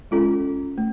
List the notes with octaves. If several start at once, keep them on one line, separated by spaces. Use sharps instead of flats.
G#3 C#4 F4 A4
A3